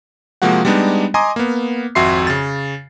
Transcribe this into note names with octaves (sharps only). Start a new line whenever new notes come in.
C3 F3 G#3 A#3 F#4 F#5
G3 G#3 B3 D4 D#4
D#5 G#5 A#5 C6 D6 D#6
A#3 B3
G#1 F2 F#4 E5 C6 C7
C#3 A6